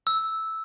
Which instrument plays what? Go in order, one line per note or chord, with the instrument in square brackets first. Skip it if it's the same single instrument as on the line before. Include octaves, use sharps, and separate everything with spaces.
[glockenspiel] E6